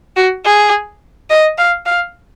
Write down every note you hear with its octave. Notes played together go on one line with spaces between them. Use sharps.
F#4
G#4
D#5
F5
F5